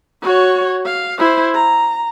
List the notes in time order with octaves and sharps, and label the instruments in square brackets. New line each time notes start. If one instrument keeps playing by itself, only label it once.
[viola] F#4 C#5
F5
E4 C5
A#5